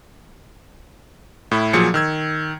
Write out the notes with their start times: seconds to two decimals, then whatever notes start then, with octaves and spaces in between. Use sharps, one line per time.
1.51 A2 E4
1.73 A#2 F3 F#3 G#4 C#7
1.94 D#3 E6 G#6